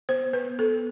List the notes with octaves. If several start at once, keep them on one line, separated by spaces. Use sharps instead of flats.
B3 C5
B3 B4
B3 A4